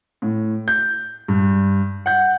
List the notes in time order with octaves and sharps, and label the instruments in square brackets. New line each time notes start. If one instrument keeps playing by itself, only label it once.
[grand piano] A2
G6
G2
F#5 G6